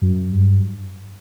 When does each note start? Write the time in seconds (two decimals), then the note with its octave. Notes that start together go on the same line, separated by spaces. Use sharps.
0.01 F#2
0.32 G2